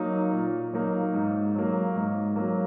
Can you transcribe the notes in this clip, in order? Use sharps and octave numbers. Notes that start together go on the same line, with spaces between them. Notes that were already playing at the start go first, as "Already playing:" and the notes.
Already playing: F#3 A#3 D#4
A#2
F#3 A#3 D#4
G#2
F#3 A#3
G#2
F#3 A#3